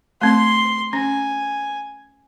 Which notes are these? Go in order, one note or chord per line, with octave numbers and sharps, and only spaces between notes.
A3 C4 C6
C#4 G#5